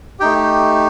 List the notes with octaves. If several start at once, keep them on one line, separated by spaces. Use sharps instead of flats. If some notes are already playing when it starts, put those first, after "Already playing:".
A3 D#4 G4 G5